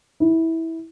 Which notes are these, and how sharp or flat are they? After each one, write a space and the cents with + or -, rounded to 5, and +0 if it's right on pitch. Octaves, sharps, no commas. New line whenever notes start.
E4 -20